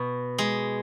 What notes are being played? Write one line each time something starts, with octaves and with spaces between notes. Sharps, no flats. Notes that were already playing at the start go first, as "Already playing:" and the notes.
Already playing: B2
G#3